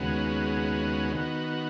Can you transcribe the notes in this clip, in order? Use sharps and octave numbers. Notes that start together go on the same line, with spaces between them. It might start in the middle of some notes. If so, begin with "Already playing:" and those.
Already playing: D#2 C#3 G#3 B3 F#4
D#3 B3 F#4